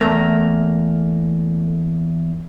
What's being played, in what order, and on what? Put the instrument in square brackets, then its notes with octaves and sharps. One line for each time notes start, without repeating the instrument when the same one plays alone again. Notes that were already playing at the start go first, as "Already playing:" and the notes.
[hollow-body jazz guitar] E2 A#3 [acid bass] A3